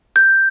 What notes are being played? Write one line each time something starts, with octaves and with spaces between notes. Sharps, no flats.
G6